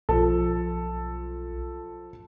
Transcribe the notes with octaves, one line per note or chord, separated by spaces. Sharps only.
B1 F3 A4